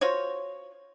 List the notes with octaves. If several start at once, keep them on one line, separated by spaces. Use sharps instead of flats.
F4 F#4 C5 C#5